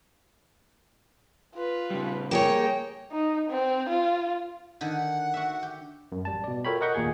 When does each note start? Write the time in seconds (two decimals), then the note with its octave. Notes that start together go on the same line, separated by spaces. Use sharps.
1.55 F4 B4
1.90 C#3 G3
2.31 A#3 G#4 C#5 G5
3.12 D#4
3.50 C4
3.89 F4
4.81 D3 D#3 F#5
5.34 F#4 E5
5.63 G4
6.12 F#2
6.25 A1 G3 A5
6.44 B2 D5
6.65 F4 A4 A#4 C#5 G5 B5
6.81 A#4 D#5 F#5 C#6 G6
6.95 D#2 A#2 A#3 G4 G#4 G#6